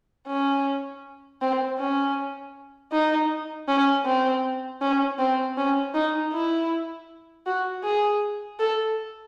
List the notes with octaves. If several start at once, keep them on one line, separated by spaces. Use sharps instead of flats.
C#4
C4
C#4
D#4
C#4
C4
C#4
C4
C#4
D#4
E4
F#4
G#4
A4